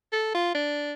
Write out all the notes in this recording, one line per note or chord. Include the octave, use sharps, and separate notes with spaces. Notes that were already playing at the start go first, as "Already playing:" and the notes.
A4
F4
D4